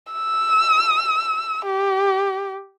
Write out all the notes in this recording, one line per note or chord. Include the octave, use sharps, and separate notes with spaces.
E6
G4